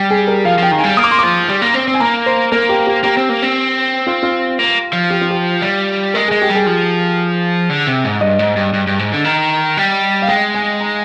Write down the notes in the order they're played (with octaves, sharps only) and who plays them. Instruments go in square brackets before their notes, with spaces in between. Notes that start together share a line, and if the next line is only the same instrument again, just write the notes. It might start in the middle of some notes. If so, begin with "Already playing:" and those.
Already playing: [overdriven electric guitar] G3 [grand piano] G4
[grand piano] G#4
A#4
[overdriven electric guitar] F3 [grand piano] F5
[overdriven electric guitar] F3 [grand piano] G5
[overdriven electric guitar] D#3
[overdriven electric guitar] G3 [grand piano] G#5
[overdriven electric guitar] A#3 [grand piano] D#6
[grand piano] D6
C6
[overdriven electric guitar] F3 [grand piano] D6
[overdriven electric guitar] G3
A#3
C4
C4
[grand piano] G#5
[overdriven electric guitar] A#3 [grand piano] A#5
[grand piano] C5
[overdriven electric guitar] A#3 [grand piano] A#4
[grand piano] G4
G4
[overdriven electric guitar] A#3 [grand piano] G4
[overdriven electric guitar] C4
A#3
C4
[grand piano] F4
F4
[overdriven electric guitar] A#3
F3
[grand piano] G4
F4
G4
[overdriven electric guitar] G3
[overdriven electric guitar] G#3 [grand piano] A#4
[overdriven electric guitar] G#3 [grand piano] G#4
[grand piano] G4
[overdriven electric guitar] G3
[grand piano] G#4
[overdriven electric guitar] F3
D3
C3
G#2
[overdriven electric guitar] G2 [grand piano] D#5
[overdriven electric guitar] G#2
G2
G2
G2
G#2
D3
D#3
G3
[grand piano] F5
[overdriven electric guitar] G#3 [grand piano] G5
[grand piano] G#5
A#5